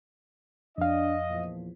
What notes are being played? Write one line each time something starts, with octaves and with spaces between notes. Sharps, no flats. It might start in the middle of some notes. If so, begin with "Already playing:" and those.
F2 D4 D#5 F5
E2 A#2 F3